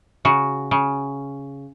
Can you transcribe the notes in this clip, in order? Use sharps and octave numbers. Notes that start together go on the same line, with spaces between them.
C#3 F#4
C#3